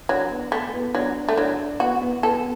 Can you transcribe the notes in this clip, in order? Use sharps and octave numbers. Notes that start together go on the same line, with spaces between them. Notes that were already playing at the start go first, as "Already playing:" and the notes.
F#3 D4
B3
A3
B3
F#3 D4
A3
F#3 D4
B3 F#4
B3
B3 A4